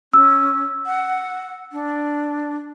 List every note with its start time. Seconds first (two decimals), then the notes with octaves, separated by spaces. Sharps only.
0.13 C#4 E6
0.86 F#5
1.73 D4